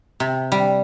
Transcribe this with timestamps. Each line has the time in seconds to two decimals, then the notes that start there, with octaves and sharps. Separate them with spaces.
0.20 C3
0.52 G3